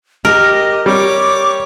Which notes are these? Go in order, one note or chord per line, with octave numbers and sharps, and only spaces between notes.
G4 A#4 D#5
G3 C#5 D6